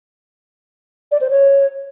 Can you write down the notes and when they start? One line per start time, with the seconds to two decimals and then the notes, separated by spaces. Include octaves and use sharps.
1.11 D5
1.20 C5
1.30 C#5